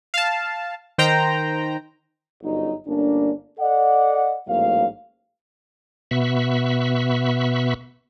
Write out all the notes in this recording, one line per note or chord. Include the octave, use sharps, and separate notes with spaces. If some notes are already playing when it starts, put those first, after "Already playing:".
F5 A5
D#3 C5 G5 A#5
G1 F#2 F#3 D#4
G1 A#3 C#4 D4
A4 D5 D#5 F#5
A1 G#2 F#3 A#3 F5
B2 B3 E5 B5 C#6